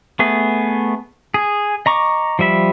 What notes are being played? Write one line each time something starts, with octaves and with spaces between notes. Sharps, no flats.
A3 B3 G#4
G#4
D#5 A#5 C#6 D6
F3 G3 E5 B5